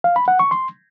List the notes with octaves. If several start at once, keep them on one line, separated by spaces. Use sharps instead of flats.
F5
B5
F#5
C#6
C6